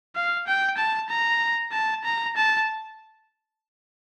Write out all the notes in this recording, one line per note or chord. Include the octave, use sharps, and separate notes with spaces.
F5
G5
A5
A#5
A5
A#5
A5